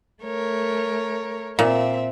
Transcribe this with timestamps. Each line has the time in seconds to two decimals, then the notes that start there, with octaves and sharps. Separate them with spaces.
0.23 A3 A#4 C#5
1.59 A#2 C4 E5